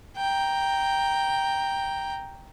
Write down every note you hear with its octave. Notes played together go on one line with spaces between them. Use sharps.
G5 A#5